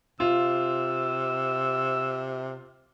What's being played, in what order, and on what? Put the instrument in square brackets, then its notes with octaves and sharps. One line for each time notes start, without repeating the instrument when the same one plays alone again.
[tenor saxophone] C3 [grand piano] F4 [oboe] E6